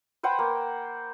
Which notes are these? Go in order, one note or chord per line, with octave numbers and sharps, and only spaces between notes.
B4 C5 F#5 G5
A#3